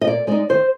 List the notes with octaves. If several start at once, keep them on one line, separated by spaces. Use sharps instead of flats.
D#5
A#2 D5
G#3 D#4 D5
D#3 C5